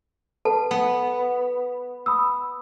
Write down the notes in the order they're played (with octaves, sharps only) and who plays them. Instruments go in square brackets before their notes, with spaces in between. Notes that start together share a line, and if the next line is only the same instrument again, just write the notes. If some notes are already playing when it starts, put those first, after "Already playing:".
[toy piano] A4 F#5 A5 [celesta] B4
[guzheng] B3
[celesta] B5 D#6 E6